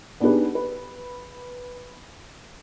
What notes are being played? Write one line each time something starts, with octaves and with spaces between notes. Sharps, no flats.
B3 D4 D#4 G4 G#4 B4
B4